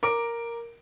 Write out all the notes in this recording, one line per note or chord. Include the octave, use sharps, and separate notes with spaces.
A#4 D6 D7